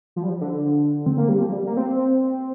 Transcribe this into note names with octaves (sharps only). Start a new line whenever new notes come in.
F3
G3
F3
D3
C4
A#3
G3
F3
A#3
G3
A#3
C4